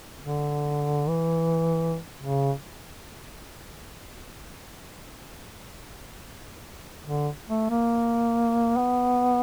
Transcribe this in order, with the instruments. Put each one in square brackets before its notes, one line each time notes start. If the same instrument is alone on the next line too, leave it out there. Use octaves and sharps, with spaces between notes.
[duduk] D3
E3
C#3
D3
A3
A#3
B3